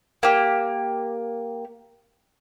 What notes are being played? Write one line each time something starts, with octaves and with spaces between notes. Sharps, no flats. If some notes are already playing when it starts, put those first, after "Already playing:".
A#3 G4